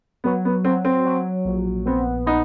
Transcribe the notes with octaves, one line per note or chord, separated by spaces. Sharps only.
F#3 B3
B3
F#3 C4
C4
F#3
A#1
B3 C4
B3 D#4